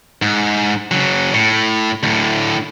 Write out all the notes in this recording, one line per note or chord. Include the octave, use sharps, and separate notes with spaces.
G#2
C#3 F#3
A2
D2 A2